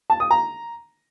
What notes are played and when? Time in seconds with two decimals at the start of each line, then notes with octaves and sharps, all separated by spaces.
0.10 A5
0.20 D#6
0.31 A#5